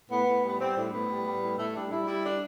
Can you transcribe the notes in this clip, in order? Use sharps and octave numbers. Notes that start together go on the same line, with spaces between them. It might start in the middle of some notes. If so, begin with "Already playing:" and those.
A2 B3
A2
G3
B3
G3 C4
A2 D4
A2 B3
G3
G3
A2
A2 A3
G3 D4
G3 E4
G3 E4
D4